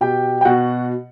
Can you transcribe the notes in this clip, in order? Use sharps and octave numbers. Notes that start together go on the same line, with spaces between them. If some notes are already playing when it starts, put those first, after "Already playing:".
B2 G4 G5
G5
B2 F#4 F#5